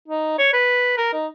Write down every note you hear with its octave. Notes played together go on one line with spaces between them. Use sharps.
D#4
C#5
B4
A#4
D#4